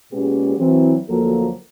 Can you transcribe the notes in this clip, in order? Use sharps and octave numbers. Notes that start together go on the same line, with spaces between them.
A#2 G#3 B3 C#4 G4 G#4
E3 F#3 C4
D2 F3 F#3 A#3 A4 A#4